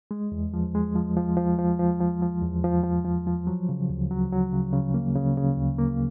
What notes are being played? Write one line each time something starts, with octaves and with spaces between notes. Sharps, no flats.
G#3
E2
F3
G#3
F3
F3
F3
F3
F3
F3
F3
E2
F3
F3
F3
F3
F#3
C#3
D2
F#3
F#3
C#3
C#3
A#3
C#3
C#3
D2
A#3